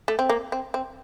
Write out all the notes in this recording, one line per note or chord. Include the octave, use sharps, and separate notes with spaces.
A3
C4
A#3
C4
C4